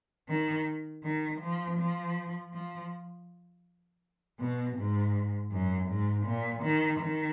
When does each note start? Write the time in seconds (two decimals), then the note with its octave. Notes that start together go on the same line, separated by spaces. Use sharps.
0.29 D#3
1.04 D#3
1.41 F3
1.79 F3
2.53 F3
4.40 B2
4.77 G#2
5.51 F#2
5.89 G#2
6.26 A#2
6.63 D#3
7.01 D#3